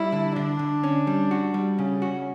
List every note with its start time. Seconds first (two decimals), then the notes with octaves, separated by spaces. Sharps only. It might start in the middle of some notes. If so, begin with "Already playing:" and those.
Already playing: G3 E4
0.12 D3
0.36 D3 D4
0.59 D3
0.84 C#4
1.07 G3
1.31 F#4
1.54 G3
1.78 C#3 C#4
2.02 F#4